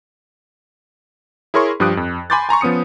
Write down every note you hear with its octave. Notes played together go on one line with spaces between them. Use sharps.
E4 G#4 A#4 C#5 C6 C#6
G2 F3 G4 D#6 F#6 D7
F2
G#5 B5 C6 D6 G6 A6
G#5 A#5 C6 C#6
F3 B3 C#4 D#6 C#7